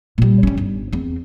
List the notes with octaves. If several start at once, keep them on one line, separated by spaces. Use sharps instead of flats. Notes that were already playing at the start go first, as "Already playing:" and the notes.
A#2 G3
G3 C#4
G1
E2 C4